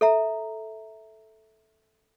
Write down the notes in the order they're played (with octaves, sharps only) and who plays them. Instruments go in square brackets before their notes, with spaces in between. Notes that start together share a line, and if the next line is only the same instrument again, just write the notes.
[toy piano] A4 E5 A#5